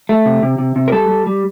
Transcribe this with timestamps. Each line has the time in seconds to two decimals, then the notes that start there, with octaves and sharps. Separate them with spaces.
0.09 A3
0.26 C3
0.43 C3
0.58 C3
0.76 C3
0.88 A#4
0.92 G3 A4
1.09 G3
1.27 G3